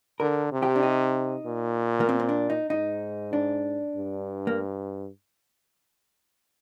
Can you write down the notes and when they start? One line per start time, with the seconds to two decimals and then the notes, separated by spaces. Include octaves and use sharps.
0.20 D3 A#4
0.52 C3
0.63 G4
0.76 D4
0.83 D#4
1.45 A#2
2.00 A#3
2.09 C4
2.20 C4
2.29 D4
2.50 D#4
2.70 G#2 D#4
3.33 D4
3.96 G2
4.47 A#3